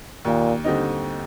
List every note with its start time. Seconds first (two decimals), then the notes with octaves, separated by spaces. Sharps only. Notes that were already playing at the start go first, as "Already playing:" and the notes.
0.25 D#2 A#2
0.64 D3 G3 C4 D#4